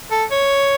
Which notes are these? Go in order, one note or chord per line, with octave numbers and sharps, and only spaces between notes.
A4
C#5